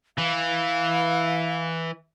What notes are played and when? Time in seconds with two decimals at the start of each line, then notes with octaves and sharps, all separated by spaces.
0.18 E3 F5